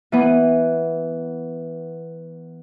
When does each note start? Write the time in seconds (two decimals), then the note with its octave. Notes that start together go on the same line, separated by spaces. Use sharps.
0.12 E3 B3